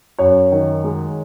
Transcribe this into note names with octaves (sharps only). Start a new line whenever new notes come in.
F#2 C#5
D#3
G#3